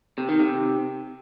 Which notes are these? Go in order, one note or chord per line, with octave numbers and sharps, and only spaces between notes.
C3
D#3
C3